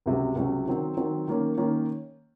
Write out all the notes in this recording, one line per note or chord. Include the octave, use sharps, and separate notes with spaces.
C#2 C3 F#3
C#2 C3 F#3
D#3 F#3 C4
D#3 F#3 C4
D#3 A#3 C#4
D#3 A#3 C#4